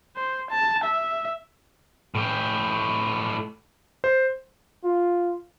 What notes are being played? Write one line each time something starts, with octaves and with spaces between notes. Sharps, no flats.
C5
A5
E5
A2 G4
C5
F4